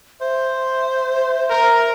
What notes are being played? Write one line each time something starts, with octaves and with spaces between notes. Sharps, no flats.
C5 E5
A#4